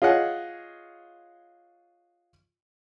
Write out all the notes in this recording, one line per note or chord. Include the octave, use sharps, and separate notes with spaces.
F4 G#4 C#5 D#5 F#5